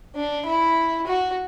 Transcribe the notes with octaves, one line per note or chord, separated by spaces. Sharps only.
D4
E4
F#4